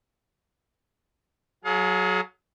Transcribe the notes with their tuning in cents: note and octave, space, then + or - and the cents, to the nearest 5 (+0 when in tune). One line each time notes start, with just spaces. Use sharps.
F#3 +0 G#4 +35 F5 +35